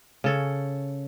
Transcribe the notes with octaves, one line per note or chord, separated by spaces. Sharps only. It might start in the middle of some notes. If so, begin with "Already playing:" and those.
C#3 A4 C#5